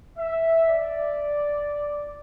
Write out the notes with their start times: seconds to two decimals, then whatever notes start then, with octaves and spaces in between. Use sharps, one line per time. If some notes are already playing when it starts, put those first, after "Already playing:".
0.18 E5
0.69 D5